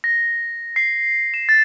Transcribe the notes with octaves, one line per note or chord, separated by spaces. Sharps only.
A#6
C7
E7
A6